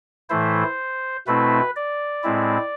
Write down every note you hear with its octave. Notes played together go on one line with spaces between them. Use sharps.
A2 E3 A3 E4 C5
B2 A3 C4 E4 B4
D5
A2 G#3 C4 E4